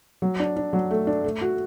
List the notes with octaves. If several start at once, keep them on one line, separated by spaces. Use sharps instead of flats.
F#3
D4
D4
F#3
A3
D4
A3
F#4